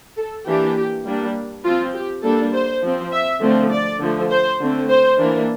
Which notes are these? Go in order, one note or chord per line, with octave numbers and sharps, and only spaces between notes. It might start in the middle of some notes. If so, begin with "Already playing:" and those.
A4
E3 A#3 D4 G4
G3 A#3 D4
F3 C4 F4
G4
G3 A#3 D4 A4
C5
F3 C4
E5
D3 F3 A3 C4
D5
D3 F3 A3
C5
D3 A3 C4
C5
E3 A#3 D4